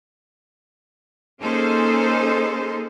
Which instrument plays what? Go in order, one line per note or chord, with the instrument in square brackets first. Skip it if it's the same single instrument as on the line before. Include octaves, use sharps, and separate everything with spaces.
[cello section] A#3 C#4 D#4 G#4 A4 C5